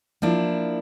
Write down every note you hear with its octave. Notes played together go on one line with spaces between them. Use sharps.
F3 A#3 D4 E4